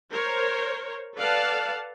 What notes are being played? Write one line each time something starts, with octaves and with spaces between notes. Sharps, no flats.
A#4 C5 C#5
A4 B4 D5 F5 F#5 A5